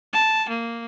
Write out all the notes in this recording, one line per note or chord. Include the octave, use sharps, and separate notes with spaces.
A5
A#3